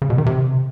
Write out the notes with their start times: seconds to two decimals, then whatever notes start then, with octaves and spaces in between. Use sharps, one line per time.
0.02 C#3
0.10 B2
0.18 D#3
0.26 C3